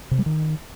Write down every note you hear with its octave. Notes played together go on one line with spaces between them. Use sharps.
C3
G3
D#3